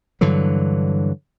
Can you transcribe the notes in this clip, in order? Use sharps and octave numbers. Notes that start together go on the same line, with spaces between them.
G2 D3 E3 F#3